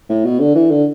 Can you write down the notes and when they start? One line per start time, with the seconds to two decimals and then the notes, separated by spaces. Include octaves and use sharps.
0.09 A2
0.24 B2
0.39 D3
0.55 E3
0.70 D3